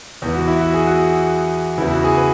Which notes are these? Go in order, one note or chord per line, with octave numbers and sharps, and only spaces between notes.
E2 E3
F#4
E4
F#4
G#4
F#4
E2 C#3 E3 E4
F#4
G#4
B4